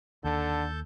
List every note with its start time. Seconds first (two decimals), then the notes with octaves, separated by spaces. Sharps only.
0.24 D#2 D3 A4 A5 G6